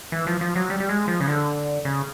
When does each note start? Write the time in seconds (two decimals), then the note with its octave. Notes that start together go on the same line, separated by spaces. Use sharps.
0.12 E3
0.27 F3
0.41 F3
0.56 F#3
0.70 G3
0.80 G3
0.89 G#3
1.08 F3
1.20 C#3
1.27 D3
1.85 C#3